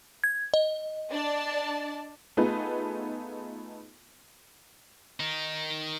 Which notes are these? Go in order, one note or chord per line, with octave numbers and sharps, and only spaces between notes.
G#6
D#5
D4 D5 A5
A3 B3 D#4 F4 G#4 B4
D#3 D#4